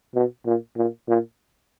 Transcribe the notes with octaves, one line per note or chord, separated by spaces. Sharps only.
B2
A#2
A#2
A#2